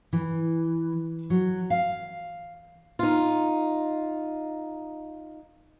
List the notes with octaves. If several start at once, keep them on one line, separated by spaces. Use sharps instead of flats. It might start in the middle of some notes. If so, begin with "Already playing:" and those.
E3
F#3
F5
D#4 F4